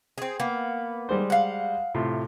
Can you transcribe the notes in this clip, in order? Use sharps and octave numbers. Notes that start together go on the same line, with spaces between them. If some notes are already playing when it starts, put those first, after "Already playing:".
C4 G#4
A#3 B3
G3 G#3 C5
F5 F#5
A2 C3 F4